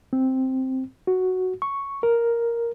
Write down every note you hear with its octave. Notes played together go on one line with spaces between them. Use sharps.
C4
F#4
C#6
A#4